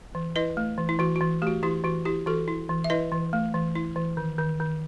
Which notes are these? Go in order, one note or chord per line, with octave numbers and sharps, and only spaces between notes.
E3
E4 B4 D#5
A3
E3
E4
E3 F#4
F#4
E3
A3 F#4 G4
E3 E4 G4
E3 F#4
E4 G4
E3 F#4 A4
E4
E3
E5
E4 B4 D#5
E3
A3
E3
E4
E3
D#3
D#3
D#3